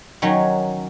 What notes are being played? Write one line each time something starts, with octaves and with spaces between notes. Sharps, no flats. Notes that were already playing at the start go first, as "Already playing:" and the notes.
D#3 F#3 C#4 F#4 C#5